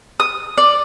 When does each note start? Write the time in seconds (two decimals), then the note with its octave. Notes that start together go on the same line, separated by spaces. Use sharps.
0.20 D#6
0.58 D5